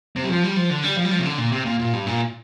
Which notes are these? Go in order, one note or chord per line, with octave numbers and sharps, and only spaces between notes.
C3
G3
F3
G3
F3
D3
G3
F3
G3
F3
C3
D3
A#2
C3
A#2
A#2
G2
A#2